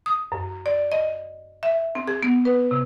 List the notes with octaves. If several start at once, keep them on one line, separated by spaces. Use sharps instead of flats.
D#6
F#2
D5
D#5
E5
C4
G#4
B3
B4
C3